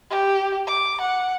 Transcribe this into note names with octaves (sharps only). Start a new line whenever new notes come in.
G4
D6
F#5